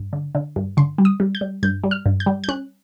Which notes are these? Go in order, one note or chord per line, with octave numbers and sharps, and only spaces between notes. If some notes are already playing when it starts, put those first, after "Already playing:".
Already playing: G2
D3
D3
G2
D3 C6
G3
D#6
G3
G6
G3
G2 G6
G3
F6
G2
G6
G3
G6
C#4 F#6